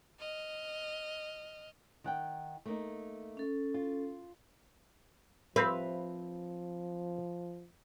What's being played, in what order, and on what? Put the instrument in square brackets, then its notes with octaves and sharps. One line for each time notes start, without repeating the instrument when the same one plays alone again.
[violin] D#5 F6
[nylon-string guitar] D#3 F#5 G5
A3 A#3 D#4
[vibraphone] C#4 A4
[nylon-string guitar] F4
[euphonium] F3 [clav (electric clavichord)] C4 E5 F5 [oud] B4